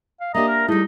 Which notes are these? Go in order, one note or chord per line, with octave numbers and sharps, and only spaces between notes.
F5
A#3 D4 G4 D#5 E5 A#5
A#4
G3 A3 D#4 E4 G#4